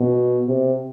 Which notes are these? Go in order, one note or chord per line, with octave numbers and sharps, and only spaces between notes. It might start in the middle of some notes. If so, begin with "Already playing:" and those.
Already playing: B2
C3